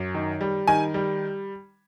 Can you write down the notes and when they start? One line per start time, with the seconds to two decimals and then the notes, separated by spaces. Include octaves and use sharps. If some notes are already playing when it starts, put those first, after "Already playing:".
Already playing: F#2
0.15 D#3
0.41 G3
0.68 D#3 G#5
0.94 G3